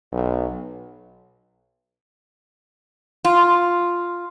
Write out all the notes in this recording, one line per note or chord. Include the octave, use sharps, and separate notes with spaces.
B1
F4